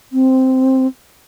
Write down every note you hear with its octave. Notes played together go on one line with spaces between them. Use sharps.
C4